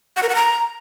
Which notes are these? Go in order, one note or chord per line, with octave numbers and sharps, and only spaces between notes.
F#5
A#4
F#5
A#5